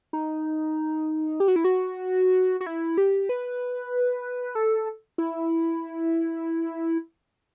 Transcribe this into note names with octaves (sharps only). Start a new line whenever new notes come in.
D#4
G4
F#4
E4
F#4
F#4
E4
G4
B4
A4
E4